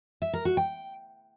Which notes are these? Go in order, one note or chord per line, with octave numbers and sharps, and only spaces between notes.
E5
A#4
F#4
G5